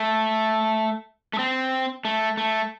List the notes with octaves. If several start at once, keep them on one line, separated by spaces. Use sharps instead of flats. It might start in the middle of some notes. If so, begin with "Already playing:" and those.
Already playing: A3
A3
C4
A3
A3